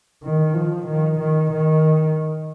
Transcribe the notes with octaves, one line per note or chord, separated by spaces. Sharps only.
D#3
F3
D#3
D#3
D#3